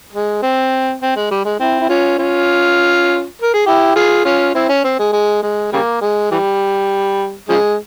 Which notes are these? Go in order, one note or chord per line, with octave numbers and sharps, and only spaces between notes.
G#3
C4
C4
G#3
G3
G#3
C4 E4
E4
C#4 F4
C#4 F4
A#4
G#4
E4 G4
F4 G#4
C#4 F4
C4 E4
C#4
C4
G#3
G#3
G#3
C#3 G3 A#3
G#3
E3 G3
C#3 F3 G#3